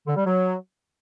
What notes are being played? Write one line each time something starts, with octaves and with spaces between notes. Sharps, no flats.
D3
G3
F#3